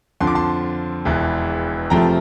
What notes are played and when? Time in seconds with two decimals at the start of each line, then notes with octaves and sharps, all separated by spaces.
0.20 F2 D3 F3 C6
0.27 D6
0.35 A5 C6
1.05 E1 E2 E3
1.90 F2 C3 F3 A3 G5 A#5